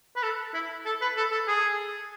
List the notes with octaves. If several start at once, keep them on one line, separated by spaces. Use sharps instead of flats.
B4
A4
E4
A4
B4
A4
A4
G#4